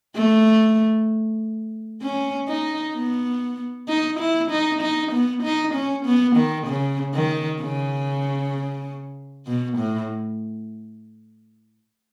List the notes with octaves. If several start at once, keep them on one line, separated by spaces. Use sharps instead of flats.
A3
C#4
D#4
B3
D#4
E4
D#4
D#4
B3
D#4
C#4
B3
D#3
C#3
D#3
C#3
B2
A2